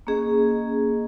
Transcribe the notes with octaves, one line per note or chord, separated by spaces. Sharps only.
A#3 C#4 G#4 D#5